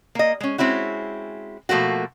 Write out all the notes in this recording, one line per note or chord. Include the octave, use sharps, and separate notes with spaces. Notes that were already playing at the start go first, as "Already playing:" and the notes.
A#3 D#5
G#3 C#4
G#3 C4 C#4 E4 F#4
B2 F3 A3 A#3 F#4